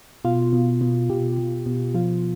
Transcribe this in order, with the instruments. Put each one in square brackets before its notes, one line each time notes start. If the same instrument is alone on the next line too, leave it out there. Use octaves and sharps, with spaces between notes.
[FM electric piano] B2 F4
B2
B2
B2 G4
B2
B2
F3 F4